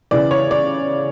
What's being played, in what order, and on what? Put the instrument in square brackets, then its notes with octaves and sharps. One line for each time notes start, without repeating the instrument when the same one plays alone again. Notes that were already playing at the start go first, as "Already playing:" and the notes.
[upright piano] C#3 E3 D5
C#5
D5